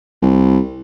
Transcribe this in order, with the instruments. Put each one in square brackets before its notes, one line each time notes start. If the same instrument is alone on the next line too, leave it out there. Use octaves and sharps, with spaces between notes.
[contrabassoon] C2